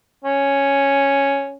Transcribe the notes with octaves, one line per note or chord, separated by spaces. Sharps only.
C#4